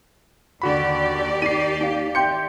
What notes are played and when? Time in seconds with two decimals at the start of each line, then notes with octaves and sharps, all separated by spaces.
0.62 D#2 D3 F#4 G4 D5 B5
1.42 D#4 C7 D#7
1.80 D#4 F5
2.15 E5 G5 C6 G6 C#7